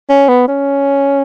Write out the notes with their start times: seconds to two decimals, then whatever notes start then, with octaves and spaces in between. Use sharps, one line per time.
0.09 C#4
0.29 B3
0.48 C#4